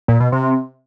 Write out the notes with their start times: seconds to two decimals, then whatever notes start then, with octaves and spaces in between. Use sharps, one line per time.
0.08 A#2
0.20 B2
0.32 C3